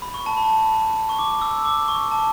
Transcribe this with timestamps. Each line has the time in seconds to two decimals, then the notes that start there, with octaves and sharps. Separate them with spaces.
0.02 B5
0.14 C#6
0.26 A5
0.37 B5
1.09 C#6
1.19 D6
1.42 E6
1.65 D6
1.88 C#6
2.11 A5